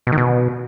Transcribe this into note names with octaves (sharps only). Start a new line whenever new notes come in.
B2
D#3
B2